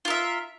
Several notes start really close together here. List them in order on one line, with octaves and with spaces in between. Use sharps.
F4 A#4 E5